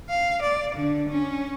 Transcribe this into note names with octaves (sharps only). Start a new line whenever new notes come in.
F5
D5
D3
C#4